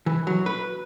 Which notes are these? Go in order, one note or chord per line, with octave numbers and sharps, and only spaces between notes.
E3
F#3
B4